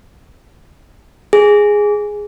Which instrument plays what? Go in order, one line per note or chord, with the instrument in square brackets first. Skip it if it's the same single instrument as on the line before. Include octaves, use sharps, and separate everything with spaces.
[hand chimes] G#4